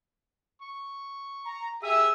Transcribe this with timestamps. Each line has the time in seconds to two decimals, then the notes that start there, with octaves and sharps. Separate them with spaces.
0.62 C#6
1.45 A#5
1.83 G4 G#4 E5 D#6